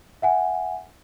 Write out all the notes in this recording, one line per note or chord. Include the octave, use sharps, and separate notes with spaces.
E5 F#5 G#5